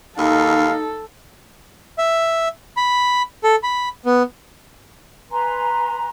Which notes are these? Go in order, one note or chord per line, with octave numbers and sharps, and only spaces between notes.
D#2 D#4 A4 F5
E5
B5
A4
B5
B3
B4 G#5 A#5 C6